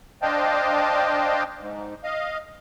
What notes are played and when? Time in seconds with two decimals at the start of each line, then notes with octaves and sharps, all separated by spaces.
0.22 D4 C5 D#5 F5 G5 A5
1.59 G#2
2.04 D#5 F5